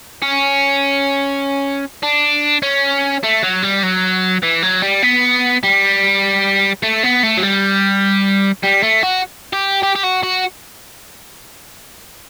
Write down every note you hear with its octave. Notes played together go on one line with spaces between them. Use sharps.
C#4
D4
C#4
A3
F#3
G3
F#3
E3
F#3
G3
B3
G3
A3
B3
A3
F#3
G3
G3
A3
F#4
G4
G4
G4
F#4
F#4